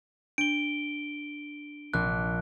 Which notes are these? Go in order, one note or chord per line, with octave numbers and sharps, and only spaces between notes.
D4 D7 G7
A#1 F#6